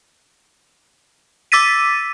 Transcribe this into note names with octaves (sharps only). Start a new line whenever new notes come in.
D6 E6 A6 B6 D#7